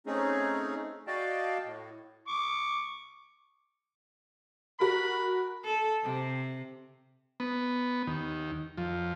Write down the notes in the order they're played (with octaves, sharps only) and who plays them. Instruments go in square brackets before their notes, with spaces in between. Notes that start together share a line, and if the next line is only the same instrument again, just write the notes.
[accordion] A3 C4 C#4 D#4 G#4
F#4 D5 D#5 F5 G5 A5
A2
[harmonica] C#6 D6
[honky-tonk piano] F#4 A#4 [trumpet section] B5
[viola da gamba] A4
C3
[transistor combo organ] B3
D#2
F2